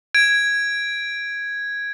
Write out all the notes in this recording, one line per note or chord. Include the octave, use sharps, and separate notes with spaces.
G#6 D7